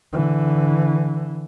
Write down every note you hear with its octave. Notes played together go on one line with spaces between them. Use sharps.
D3 E3